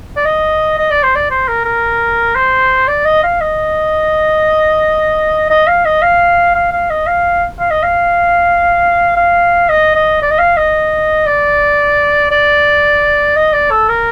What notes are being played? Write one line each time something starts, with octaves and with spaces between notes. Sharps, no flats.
D5
D#5
D#5
D5
C5
D5
C5
A#4
A#4
C5
D5
D#5
F5
D#5
D#5
F5
D#5
F5
F5
F5
D#5
F5
F5
D#5
F5
F5
D#5
D#5
D5
D#5
F5
D#5
D5
D5
D#5
D5
A4
A#4